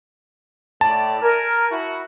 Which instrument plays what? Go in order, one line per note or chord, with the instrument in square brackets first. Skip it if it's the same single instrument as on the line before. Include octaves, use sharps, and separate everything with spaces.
[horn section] A2 D5 [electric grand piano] A5
[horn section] A#4 G#5
E4 F#4